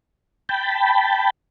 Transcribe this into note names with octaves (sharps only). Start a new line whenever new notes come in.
G5 A5 B5